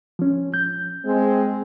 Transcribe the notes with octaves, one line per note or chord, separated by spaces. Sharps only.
F3 C#4
G6
G#3 C4